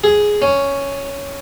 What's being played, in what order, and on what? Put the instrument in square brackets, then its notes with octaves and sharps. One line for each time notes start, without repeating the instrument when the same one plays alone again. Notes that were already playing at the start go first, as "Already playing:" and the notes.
[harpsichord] G#4
C#4